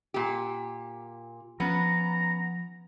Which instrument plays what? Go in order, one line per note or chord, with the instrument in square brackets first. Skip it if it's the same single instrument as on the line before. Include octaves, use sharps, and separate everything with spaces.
[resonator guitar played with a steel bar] A#2 G4
[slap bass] F3 [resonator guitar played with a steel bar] B3 C#4 [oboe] A#5